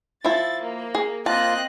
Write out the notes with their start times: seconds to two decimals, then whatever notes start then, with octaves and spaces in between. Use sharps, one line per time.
0.24 F3 E4 A6
0.61 A#3
0.95 G#4
1.26 A#3 C4 F4 D#5 A5 F#6